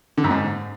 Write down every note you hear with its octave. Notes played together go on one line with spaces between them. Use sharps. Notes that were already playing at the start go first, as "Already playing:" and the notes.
D3
F#2
G#2